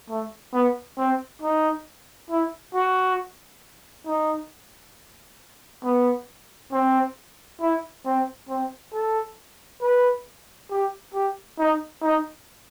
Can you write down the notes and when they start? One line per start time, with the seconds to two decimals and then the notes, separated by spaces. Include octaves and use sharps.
0.09 A3
0.53 B3
0.98 C4
1.42 D#4
2.30 E4
2.75 F#4
4.07 D#4
5.84 B3
6.72 C4
7.61 E4
8.06 C4
8.49 C4
8.94 A4
9.82 B4
10.71 G4
11.14 G4
11.59 D#4
12.03 D#4